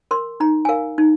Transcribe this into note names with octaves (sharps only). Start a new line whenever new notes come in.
A#4 C6
D#4 A#5
G#5
A#4 F5
D#4